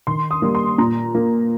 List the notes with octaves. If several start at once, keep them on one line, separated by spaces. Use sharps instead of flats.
D#3 C6
D#6
G3 A#3
C6
A#2 A#5
A#3